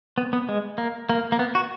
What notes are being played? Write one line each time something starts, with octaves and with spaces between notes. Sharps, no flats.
B3
B3
G#3
A#3
A#3
A#3
B3
F#4